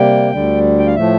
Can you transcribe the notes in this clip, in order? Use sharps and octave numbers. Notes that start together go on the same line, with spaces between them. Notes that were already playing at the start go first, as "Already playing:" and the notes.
Already playing: C3 G3 A#3 G5
D2 D3 G3
G5
F5
A2 F3 A3 E5